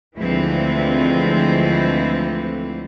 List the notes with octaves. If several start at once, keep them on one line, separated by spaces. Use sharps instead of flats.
D2 E3 F3 G#3 C4